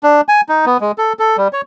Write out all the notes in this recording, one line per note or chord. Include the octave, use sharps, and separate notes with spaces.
D4
G#5
D#4
B3
G#3
A4
A4
G3
C#5